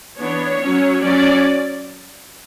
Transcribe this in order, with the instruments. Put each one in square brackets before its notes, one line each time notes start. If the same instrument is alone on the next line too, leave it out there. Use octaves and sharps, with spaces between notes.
[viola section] E3 B3 D4 C#5
F#3 C#4
F#3 C#4 D5